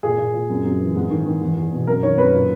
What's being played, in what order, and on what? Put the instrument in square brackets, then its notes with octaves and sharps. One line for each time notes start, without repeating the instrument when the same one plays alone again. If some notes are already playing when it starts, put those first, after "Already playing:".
[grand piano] A#2 G#4
A#2
A#2
F#2
F#2
E3
G#2
D#3
D#3
E2
E2
B2
F#2 A#4
D#3 C#5
F#2 B4
A#2